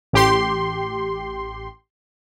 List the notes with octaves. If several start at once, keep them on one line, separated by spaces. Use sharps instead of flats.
A1 G4 C6